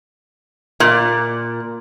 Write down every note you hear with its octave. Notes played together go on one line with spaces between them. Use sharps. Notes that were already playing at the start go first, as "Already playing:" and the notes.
A#2